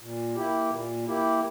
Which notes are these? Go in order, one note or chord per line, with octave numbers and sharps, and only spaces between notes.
A#2
A#3 E4 G4
A#2
A#3 E4 G4